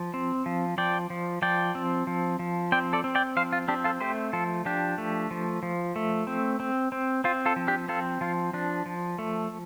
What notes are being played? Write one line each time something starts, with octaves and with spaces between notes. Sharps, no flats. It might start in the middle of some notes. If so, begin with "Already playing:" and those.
Already playing: F3
C4
F3
F3 D5 G5
F3
F3 D5 G5
C4
F3
F3
C4 D5 G5
A4 D5
C4
D5 G5
F3 C5 F5
F4
C4 D4 G4
F4 A4
A3 G4 C5
F3 F4 A4
F3 D4 G4
A3
F3
F3
A3
C4
C4
C4
C4 F4
F4 A4
F3
D4 G4
C4 F4 A4
F3 F4
F3 D4
F3
A3